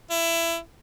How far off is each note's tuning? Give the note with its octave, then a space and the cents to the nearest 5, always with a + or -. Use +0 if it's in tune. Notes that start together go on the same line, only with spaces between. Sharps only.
E4 +20